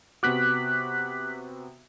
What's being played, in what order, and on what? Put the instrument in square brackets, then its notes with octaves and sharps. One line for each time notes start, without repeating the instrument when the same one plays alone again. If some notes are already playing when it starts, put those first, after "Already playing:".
[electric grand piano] C3 B3 F#4 [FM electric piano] D6 F#6 B6